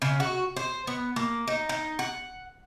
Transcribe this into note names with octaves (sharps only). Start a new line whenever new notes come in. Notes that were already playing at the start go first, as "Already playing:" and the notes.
C#3
F#4
C5
B3
A#3
D#4
D#4
F#5